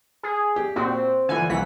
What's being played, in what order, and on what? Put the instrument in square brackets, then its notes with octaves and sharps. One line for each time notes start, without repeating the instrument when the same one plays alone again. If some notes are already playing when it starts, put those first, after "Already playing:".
[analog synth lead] G#4
[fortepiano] G4
[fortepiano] A#2 F#4 [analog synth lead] C4
[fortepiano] D3 E3 F3 [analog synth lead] G#5
[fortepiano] C2 E3 F#5 [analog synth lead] B6